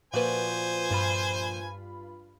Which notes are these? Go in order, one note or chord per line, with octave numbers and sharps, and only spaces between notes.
A#2 F3 F#4 B4 C5 D5 G#5
G2 F4 B5